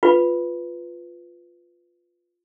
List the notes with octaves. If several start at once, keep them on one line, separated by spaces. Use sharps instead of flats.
F4 B4